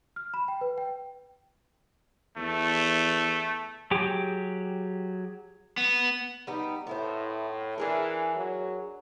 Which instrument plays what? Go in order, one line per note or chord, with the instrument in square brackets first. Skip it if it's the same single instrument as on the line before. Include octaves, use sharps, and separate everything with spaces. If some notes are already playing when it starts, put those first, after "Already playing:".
[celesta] F6
B5
G5
B4
G5
[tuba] E2 [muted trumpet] A3
[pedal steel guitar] F#3 G4 G#4 G5 D6
[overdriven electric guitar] B3
[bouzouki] G3 B3 D#4
[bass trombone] A2 [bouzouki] B3 E4 C5
[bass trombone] E3 [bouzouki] D4 G#4 A#4
[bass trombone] F#3